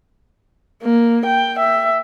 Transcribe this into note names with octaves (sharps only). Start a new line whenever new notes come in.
A#3
G5
E5